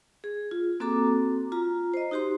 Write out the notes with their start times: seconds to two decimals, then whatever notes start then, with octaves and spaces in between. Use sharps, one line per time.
0.24 G#4
0.51 F4
0.80 A#3 C4 F#4 A4 A#5 D6
1.52 F4 A#5
1.94 C5 D#5
2.11 D#4 F#4 G4 C5 C6